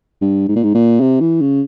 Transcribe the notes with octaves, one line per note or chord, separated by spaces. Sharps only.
G2
G#2
A#2
G#2
A#2
C3
E3
C#3